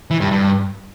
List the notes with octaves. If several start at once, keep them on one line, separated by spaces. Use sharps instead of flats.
E3
G2
G2